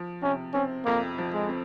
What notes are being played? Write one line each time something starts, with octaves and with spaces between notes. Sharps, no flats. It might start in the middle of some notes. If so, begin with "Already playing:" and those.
Already playing: F3
C3 C#4
C4 C#4
F2 A#3
F3
G#3
C4